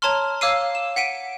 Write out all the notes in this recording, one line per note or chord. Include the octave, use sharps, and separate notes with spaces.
C#5 A5 A#5 C6 F6
C#5 F5 D6 E6 C7 D#7
E7
F#5 B6 D7 D#7